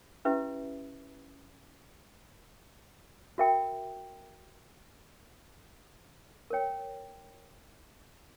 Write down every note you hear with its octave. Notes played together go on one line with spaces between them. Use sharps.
C#4 E4 G4 B4 E5
F#4 A#4 E5 G5
A#4 C#5 G5